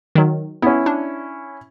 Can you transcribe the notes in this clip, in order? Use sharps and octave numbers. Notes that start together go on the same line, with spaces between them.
D#3 F#3
B3 C#4 E4
D4